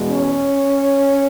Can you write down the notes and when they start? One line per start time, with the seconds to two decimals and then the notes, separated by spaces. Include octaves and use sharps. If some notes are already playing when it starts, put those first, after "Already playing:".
Already playing: E2 B2 G#3
0.09 C#4 C#5